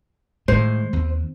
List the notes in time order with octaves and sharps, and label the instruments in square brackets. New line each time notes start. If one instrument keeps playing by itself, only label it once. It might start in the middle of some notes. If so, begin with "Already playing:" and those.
[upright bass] A2 D#3 [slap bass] G#3 [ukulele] C5
[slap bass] D#2 [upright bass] C4